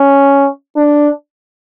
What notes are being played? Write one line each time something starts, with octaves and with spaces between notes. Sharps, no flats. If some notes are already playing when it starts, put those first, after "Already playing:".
Already playing: C#4
D4